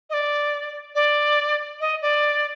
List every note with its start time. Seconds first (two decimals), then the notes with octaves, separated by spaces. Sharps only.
0.10 D#5
0.13 D5
0.95 D5
1.81 D#5
2.02 D5